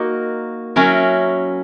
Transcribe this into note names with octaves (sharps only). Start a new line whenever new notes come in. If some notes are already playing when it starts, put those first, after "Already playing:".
Already playing: A#3 D#4 F#4 A#4
F#3 C#4 E4 A#4